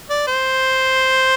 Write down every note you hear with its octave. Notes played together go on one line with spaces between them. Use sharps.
D5
C5